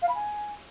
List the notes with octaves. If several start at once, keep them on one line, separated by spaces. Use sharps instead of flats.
F5
B5
G#5